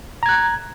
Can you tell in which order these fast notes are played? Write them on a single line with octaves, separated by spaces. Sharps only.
A#5 G#6 F#6